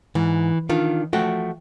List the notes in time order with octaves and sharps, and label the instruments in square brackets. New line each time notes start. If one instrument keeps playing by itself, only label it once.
[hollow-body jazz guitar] G#2 [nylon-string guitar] E3
[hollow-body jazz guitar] D#3 D4 [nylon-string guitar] F4
[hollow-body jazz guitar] F3 A3 F#4 [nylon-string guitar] G5